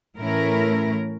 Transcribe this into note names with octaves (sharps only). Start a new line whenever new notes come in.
A2 E3 A3 C#4 E4 A#4